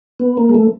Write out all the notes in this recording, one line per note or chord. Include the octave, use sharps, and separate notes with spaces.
B3
A#3
G#3
A3